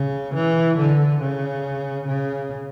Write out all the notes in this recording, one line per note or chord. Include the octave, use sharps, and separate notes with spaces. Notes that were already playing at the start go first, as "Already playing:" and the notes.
Already playing: C#3
E3
D3
C#3
C#3